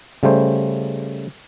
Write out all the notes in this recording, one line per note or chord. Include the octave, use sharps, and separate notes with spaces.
C#3 G3 A3 C5